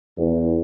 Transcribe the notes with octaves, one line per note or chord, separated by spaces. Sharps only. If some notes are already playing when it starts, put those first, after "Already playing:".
E2